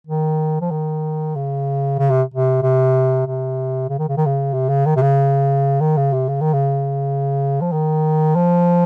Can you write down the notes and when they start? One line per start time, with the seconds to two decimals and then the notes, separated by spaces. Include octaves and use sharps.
0.07 D#3
0.61 F3
0.71 D#3
1.36 C#3
1.99 C#3
2.11 C3
2.34 C3
2.62 C3
3.26 C3
3.89 C#3
3.99 D#3
4.08 C#3
4.18 D#3
4.26 C#3
4.54 C3
4.69 C#3
4.86 D#3
4.96 C3
5.02 C#3
5.81 D#3
5.97 C#3
6.13 C3
6.28 C#3
6.41 D#3
6.53 C#3
7.61 F3
7.72 D#3
8.36 F3